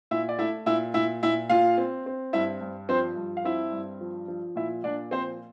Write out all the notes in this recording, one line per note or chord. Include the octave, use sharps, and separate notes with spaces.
A#2 E4 E5
D5
A3 E4 E5
A#2 E4 E5
A#2 E4 E5
A#2 E4 E5
A#2 F4 F5
C4
C4
G2 E4 E5
G2
F3 C4 C5
G2
F5
C4 E4 E5
G2
F3
F3
A#2 E4 E5
A#2 D4 D5
F3 C4 C5